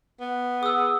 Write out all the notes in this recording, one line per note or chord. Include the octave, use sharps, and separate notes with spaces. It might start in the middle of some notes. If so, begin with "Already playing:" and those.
B3
G#4 D#6 E6